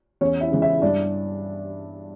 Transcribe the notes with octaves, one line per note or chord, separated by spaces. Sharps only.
E2 C#4 C#5
E4 E5
C#3 E3
E4 E5
G2 D4 D5